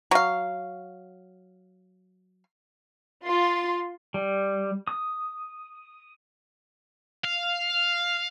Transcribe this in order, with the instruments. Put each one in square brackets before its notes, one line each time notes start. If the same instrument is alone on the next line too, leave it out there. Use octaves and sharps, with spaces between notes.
[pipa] F#3 F5
[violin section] F4 C6
[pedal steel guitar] G3
D#6
[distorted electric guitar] F5